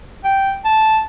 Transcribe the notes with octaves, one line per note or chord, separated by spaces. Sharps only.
G5
A5